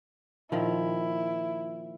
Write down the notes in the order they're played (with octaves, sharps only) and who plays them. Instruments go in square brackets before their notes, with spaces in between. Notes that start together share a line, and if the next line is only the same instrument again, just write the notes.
[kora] A#2 D#3 F3 [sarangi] E4